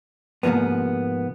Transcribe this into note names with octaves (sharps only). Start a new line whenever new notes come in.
G#2 C3 F3 A#3 B3